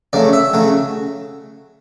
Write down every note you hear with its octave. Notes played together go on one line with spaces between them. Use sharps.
C#3 F#3 A3 D5
E5
C#3 F#3 A3